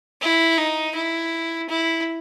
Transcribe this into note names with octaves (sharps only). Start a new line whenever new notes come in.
E4
D#4
E4
E4